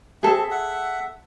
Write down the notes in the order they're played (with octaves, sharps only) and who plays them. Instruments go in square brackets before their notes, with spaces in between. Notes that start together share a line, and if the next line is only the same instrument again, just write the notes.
[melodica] C4 E5 [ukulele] G#4 A4
[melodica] E5 F#5